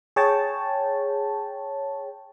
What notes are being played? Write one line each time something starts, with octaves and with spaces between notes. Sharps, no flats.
G#4 C#5 G5 A5